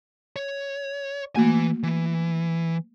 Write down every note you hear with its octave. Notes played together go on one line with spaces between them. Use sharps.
C#5
E3 A3 A#3 F#4 G#5
E3